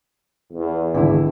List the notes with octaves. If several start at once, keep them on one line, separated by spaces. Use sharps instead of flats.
E2
G#1 C#2 D3 E4